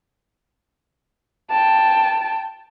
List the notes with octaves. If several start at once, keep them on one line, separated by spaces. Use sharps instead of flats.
G5 A5